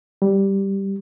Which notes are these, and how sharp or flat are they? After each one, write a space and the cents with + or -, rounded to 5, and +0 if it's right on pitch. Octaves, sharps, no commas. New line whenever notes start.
G3 +0